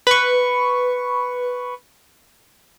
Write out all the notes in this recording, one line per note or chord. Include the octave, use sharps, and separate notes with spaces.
B4 C#6